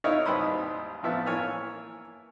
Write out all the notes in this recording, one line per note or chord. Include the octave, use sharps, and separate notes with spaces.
D#4 E4 A#4 C#5 D#5 F5
G#1 D#2 G3 B4 C5 D#6
A1 A2 F3 B3 E5
E3 A#3 C#5 G#5 F6